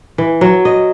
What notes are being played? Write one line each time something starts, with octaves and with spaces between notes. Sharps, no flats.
E3
F#3
D#5